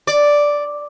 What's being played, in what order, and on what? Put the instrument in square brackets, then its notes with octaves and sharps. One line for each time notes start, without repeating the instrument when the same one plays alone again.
[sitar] D5